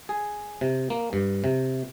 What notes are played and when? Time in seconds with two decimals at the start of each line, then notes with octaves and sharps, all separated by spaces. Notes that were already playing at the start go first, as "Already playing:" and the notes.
0.09 G#4
0.61 C3
0.90 A#3
1.13 G2
1.44 C3